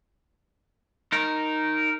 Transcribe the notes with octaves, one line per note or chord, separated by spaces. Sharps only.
D#4 A#4